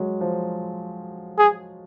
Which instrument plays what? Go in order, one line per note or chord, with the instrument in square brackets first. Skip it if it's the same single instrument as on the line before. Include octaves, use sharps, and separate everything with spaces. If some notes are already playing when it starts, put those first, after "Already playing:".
Already playing: [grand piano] F#3 G#3
F3
[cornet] G#4